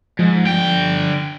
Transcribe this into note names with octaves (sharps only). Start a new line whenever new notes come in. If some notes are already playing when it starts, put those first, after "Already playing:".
G#2 F3
D3 G5